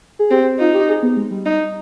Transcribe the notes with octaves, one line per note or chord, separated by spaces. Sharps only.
G#4
C4 G4
D#4 F4
G4
G#4
B3
G#3
G3
D#4